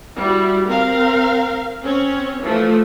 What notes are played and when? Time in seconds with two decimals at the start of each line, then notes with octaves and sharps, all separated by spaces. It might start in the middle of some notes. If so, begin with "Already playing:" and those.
0.16 G3 E4 F#4
0.64 C4 A#4 F5
1.83 C4 C#4 C#5
2.40 E3 F3 A3